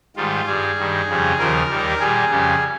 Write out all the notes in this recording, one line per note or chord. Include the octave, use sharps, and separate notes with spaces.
G#2 D#3 G3 F4
G2 G3 G#4
G2 D#3 G3
F2 C#3 G3
D#2 C#3 F3 A#4
D#2 D#3 G3
A#2 G3 G#4
F2 C#3 G3